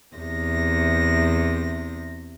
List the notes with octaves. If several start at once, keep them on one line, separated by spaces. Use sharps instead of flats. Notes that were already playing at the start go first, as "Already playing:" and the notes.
E2 C3 A#6